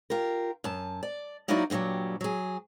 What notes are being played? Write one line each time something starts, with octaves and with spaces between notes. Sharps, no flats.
F4 G4 A#4
F#2 A5
D5
F#3 A#3 D#4 E4 F#4 D5
G2 A#2 D#3 F#3 G3
F#3 G#4